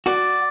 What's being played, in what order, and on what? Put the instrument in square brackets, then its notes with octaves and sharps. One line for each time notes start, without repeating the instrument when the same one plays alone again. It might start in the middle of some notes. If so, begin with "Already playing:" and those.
[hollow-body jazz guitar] F#4 [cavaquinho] D5